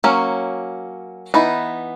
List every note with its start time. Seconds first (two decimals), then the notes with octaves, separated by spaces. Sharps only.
0.04 F#3 A#3 C#4
1.34 E3 B3 D#4